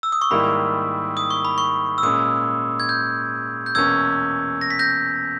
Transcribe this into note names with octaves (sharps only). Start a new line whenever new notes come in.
E6
D#6
C#6
G#2 D#3 G3 A#3 E4 B5
D#6
C#6
B5
C#6
E6
A#2 G#3 C#4 D#6
G#6
G6
G6
E2 B2 A#3 C#4 E6 G#6
A#6
B6
G6 A#6